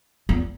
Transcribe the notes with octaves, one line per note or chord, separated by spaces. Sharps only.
E2